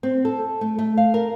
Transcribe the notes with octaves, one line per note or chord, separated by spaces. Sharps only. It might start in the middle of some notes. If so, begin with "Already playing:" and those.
C4
A4
A3
A3
F5
A#4